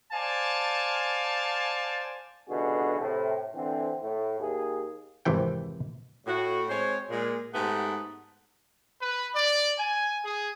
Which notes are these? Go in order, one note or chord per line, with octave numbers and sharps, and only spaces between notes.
C5 D5 F5 G#5 A5
C#2 B2 D3 E3 F#4 G#4
A2 C3
D3 E3 C4
A2
D#2 G#4
G#1 F2 C3 E3 G5
A2 F#4
G#3 C4 C5 C#5
A#2 G#3
G#2 A3 B3 G4 F#5 A5
B4
D5
G#5
G#4